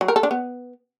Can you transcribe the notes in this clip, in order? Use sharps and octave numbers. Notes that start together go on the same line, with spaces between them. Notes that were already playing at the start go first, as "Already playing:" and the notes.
F#3
A#4
A4
D4
B3